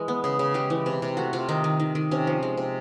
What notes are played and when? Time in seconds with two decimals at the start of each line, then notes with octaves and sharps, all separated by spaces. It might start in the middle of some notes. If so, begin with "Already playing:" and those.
Already playing: E3 G#3
0.08 B3
0.24 C#3 G#4
0.39 C#3
0.54 G#3 G4
0.70 E3
0.86 C3
1.02 C3
1.17 A3 F#4
1.33 C3 F4
1.49 D#3 D#4
1.64 D#3
1.80 D#3
1.95 D#3
2.11 C3 C#4
2.27 F3
2.43 G#3
2.57 C3